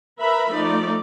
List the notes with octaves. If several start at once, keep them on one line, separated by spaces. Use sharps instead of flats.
A#4 B4 E5 A#5 B5
F3 A3 D#4 D5